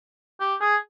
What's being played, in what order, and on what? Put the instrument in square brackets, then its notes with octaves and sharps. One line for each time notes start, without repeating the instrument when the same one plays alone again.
[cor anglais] G4
G#4